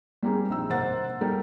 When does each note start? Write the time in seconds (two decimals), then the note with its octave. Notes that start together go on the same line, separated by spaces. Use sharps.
0.23 G3 A#3 C4 D#4 G#4
0.50 A#1 D#4 E6
0.69 G#1 A#3 C5 F#5 A6
1.21 G3 D#4 A4 A#4 G5